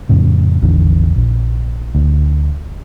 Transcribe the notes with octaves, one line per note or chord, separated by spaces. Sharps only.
F2 A2 C#3
A1 E2 D3
A#1
D2